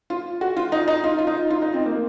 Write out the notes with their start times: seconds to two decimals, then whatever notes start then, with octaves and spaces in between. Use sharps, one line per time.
0.10 F4
0.41 F#4
0.56 F4
0.72 D#4
0.88 D#4
1.04 F4
1.19 F4
1.27 D#4
1.50 F4
1.62 D#4
1.74 C4
1.86 A#3